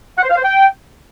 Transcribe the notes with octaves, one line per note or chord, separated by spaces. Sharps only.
F#5
C5
F5
C5
G5